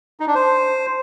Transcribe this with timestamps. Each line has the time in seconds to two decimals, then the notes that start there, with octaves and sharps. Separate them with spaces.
0.20 D#4
0.27 D4
0.35 C5